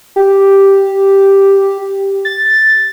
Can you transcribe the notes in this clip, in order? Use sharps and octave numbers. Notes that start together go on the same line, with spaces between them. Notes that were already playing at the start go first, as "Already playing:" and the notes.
G4
A6